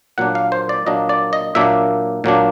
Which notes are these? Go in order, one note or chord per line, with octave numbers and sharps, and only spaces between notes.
A#2 F#3 A#3 D4 F#5
F5
C5
D5
A#2 F#3 A#3 D4 D#5
D5
D#5
A#2 F#3 A#3 D4 E5
A#2 F#3 A#3 D4